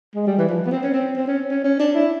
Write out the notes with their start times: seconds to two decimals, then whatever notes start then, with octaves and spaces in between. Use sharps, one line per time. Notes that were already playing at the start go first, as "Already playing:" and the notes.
0.16 G#3
0.27 G3
0.38 E3
0.49 F3
0.66 B3
0.71 C4
0.83 C#4
0.94 C4
1.17 C4
1.28 C#4
1.50 C#4
1.64 C#4
1.80 D4
1.95 E4